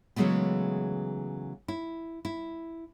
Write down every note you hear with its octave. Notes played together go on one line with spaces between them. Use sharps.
C#3 E3 F#3 G#3 A3 B3
E4
E4